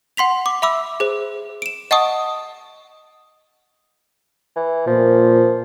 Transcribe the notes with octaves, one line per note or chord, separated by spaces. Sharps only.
F#5 C6 B6 F7
D6
E5 B5 D6 E6
G#4 C5
D7 E7
D#5 F#5 A5 C#6 D#6
E3
A#2 F3